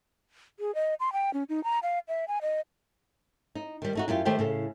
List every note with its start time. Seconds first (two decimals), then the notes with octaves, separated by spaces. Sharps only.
0.60 G#4
0.75 D#5
1.00 C6
1.13 G5
1.34 C#4
1.49 D#4
1.64 A#5
1.83 F5
2.08 E5
2.28 G#5
2.42 D#5
3.55 D#4
3.82 D#3 G3
3.95 A3 D#4 F#4
4.08 F#2 E4 F4 G4
4.25 D#3 A3 G4 C5 G5
4.39 A2 C#3 A4